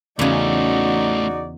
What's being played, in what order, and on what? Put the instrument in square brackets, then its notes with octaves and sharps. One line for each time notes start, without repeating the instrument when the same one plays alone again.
[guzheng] E2 C#3 [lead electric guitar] A3 C#4 [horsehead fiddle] D#4 F#4 [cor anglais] D5